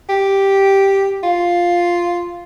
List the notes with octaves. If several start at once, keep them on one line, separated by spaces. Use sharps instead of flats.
G4
F4